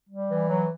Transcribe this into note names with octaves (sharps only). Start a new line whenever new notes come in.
G3
E3
F#3